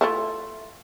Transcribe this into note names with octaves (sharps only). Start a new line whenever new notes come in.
A3 E4 F4